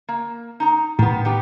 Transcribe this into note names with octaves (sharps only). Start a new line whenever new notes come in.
A#3
D#4 A#5
A2 D#3 B3
B3 D#4 G4